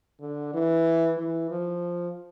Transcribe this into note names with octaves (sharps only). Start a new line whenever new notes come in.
D3
E3
E3
F3